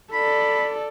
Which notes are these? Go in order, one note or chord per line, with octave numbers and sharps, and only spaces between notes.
A4 D5 B5